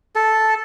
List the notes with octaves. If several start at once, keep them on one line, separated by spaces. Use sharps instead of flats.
A4